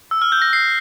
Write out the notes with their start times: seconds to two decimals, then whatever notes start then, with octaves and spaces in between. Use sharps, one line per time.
0.11 E6
0.22 F6
0.32 G6
0.42 A#6
0.53 C7